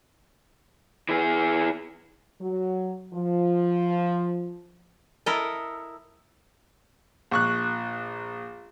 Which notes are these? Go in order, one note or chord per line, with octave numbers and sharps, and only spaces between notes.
E3 G#4
F#3
F3
E4 A4 A#4 D#5
A#1 C#6 F#6